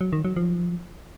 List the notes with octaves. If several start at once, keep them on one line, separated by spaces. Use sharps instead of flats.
F#3
D#3
F#3
F3